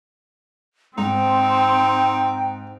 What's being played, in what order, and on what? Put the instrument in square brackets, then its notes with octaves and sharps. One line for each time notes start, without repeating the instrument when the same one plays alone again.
[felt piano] G#2 [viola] C4 [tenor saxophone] D#4 [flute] G5